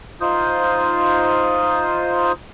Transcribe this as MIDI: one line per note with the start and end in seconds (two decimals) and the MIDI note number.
0.21 2.32 63
0.21 2.32 65
0.21 2.32 72
0.21 2.32 87
0.21 2.32 91